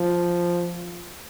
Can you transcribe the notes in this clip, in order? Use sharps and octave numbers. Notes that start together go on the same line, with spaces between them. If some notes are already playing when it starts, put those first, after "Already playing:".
Already playing: F3